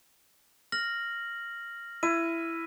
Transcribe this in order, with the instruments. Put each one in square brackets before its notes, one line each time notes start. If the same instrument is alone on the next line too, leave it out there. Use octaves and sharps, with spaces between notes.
[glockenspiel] F6 A#6 F#7
[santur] E4 [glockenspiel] D#7